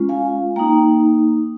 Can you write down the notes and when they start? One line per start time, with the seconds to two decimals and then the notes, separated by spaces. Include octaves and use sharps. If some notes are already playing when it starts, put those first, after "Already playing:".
Already playing: G#3 C#4 F4
0.09 F5 G#5
0.56 A#3 D#4 G5 A#5